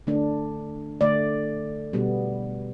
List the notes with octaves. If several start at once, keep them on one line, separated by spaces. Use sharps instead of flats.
D3 A3 D4
D3 A3 D5
B2 G3 B3